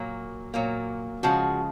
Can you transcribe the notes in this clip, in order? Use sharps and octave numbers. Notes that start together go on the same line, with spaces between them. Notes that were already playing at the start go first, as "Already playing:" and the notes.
Already playing: A#2 F#3 A#3
A#2 F#3 A#3
C#3 F3 G#3 F#4